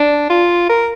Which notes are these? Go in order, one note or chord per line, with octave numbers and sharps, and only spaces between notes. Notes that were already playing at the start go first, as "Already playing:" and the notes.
Already playing: D4
F4
A#4